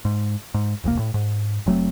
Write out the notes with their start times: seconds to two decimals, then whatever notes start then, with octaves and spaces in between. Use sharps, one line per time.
0.05 G#2
0.54 G#2
0.84 E1 C2 C#3 A#3
0.99 A2
1.14 G#2
1.66 F#1 F#3 A3 C4